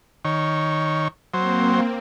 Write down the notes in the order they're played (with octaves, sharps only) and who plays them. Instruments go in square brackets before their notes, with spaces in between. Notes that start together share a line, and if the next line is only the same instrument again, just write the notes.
[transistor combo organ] D#3 C#5
[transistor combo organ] F#3 C5 [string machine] A#3 C4